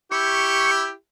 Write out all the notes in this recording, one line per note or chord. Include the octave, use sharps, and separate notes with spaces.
E4 G4 C#6